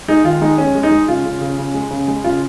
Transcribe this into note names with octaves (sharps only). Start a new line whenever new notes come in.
G#3 D#4
D#3 F4
G#3 D#4
G#3 C#4
G#3
D#4
G#3
C#3 F4
C#3
C#3
C#3
G#3
C#3
G#3
C#3 F4